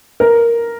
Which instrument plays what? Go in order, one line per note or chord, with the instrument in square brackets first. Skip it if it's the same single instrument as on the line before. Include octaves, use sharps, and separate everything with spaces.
[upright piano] A#4